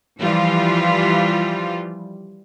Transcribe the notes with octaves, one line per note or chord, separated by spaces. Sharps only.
E3 F3 G3 F4